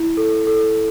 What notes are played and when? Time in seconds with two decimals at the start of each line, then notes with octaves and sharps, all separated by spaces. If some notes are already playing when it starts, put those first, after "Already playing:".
Already playing: E4
0.17 A4
0.47 A4